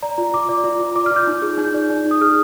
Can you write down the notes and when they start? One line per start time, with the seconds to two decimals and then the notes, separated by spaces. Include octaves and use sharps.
0.03 D5 A#5
0.18 F4
0.34 F4 D6
0.49 D5
0.64 F4
0.80 F4
0.96 D5 D6
1.06 F4 F6
1.16 G6
1.27 D#4
1.42 G#4
1.58 D#4 G6
1.74 D5
1.90 D#4
2.06 D#4
2.11 D#6
2.21 G#4 F6